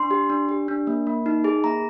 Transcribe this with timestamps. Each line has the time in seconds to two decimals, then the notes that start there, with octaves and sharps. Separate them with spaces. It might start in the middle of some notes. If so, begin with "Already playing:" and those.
Already playing: D4 C6
0.11 G4
0.30 D4
0.49 G4
0.68 D4
0.87 A#3
1.07 A#3
1.26 D#4
1.44 G#4
1.64 A#3 A#5